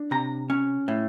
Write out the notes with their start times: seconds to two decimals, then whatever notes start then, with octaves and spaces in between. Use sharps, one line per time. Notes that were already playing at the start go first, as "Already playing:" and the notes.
Already playing: D4
0.11 C3 A#5
0.50 C#4
0.88 A2